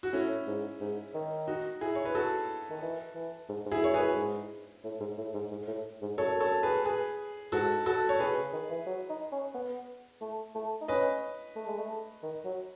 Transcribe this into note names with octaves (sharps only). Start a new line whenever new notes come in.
F#4
A2 C#4 E4
G#2
G#2
D#3
D#4 F#4
E4 G#4
C#5
B4
F#4 A4
D#3
E3
E3
G#2
G#2
E4 G#4
F#2 C#5
G#4 B4
F#2
G#2
A2
G#2
A2
G#2
G#2
A2
G#2
F#2 A4 C#5
A4 C#5
G#4 B4
G#4 B4
G#2 F#4 A4
F#4 A4
C#5
B2 G#4 B4
C#3
D#3
E3
F#3
D#4
C#4
B3
A3
A3
D#4
C#4 B4 D#5
A3
G#3
A3
D#3
F#3